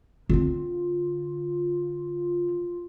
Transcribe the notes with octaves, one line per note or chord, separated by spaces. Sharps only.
D3 C4 F4